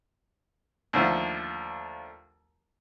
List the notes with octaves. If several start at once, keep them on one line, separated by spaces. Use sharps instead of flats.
D#2 D3 F3 A3